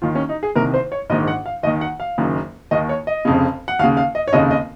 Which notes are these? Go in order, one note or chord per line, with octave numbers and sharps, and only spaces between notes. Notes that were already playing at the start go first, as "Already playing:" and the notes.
D#2 D#3 F4
C#4
D#4
G#4
C2 C3 D#3 A#4
C5
C#5
A#1 G#2 D#3 D#5
F#5
F5
D#2 D#3 D#5
F#5
F5
F#1 F#2 D#3
D#2 D#3 D#5
C#5
D#5
F1 F2 C#3
F#5
D#2 C#3 F5
F5
D#5
C#5
F1 D#2 C#3 D#5
D#5